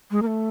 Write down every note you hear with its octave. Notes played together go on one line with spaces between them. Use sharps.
G#3
A#3
A3